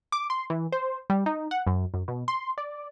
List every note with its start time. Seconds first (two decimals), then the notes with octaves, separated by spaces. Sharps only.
0.12 D6
0.30 C6
0.50 E3
0.72 C5
1.10 G3
1.26 D#4
1.51 F#5
1.67 F#2
1.94 F#2
2.08 B2
2.28 C6
2.58 D5